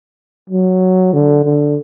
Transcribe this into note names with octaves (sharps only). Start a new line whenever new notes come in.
F#3
D3
D3